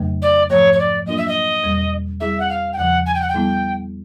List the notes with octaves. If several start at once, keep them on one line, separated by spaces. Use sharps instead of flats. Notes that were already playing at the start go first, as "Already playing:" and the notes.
Already playing: F2 C#3 F#3 A3
D5
G#2 F3 A3 C#5
C#5
D5
F#3 A#3 D4 F4 A#4 D#5
E5
D#5
E2 B2 G3
G3 C4 E4 G#4 E5
F#5
F5
G5
E2 C#3 F3 F#5
G#5
G5
F#5
G5
A#2 G3 B3 E4